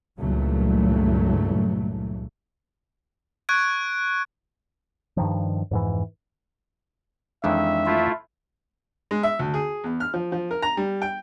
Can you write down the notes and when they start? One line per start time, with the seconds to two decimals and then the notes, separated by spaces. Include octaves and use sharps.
0.18 C#2 G2 A#2 E3 F#3 A3
3.49 C#6 F#6 G#6 D7
5.17 G2 D#3 F3
5.71 F2 G#2 E3
7.44 F2 D#3 E3 G#3 D4 E5
7.86 A3 E4 F4
9.11 G#3
9.23 E5
9.39 D2
9.54 G#4
9.84 E2
10.00 F6
10.14 F3
10.32 F3
10.51 A#4
10.62 A#5
10.77 G3
11.02 G5